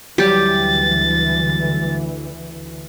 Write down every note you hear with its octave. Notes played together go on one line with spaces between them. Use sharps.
D2 D3 E3 F#3 G3 G4 A6